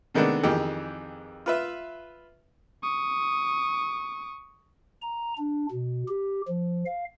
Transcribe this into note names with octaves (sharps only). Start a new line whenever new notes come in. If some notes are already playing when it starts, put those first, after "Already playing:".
C3 D#3 G#3 A3 B3 D4
F2 D#3 E3 G4 G#4
F4 B4 E5
C#6 D#6
A#5
D4
B2
G4
F3
F5